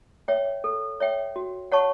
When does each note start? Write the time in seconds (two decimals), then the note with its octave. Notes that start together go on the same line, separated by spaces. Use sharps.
0.28 C#5 E5 G5
0.64 A4
1.00 C#5 E5 G5
1.36 F#4
1.72 C#5 F#5 A5 C#6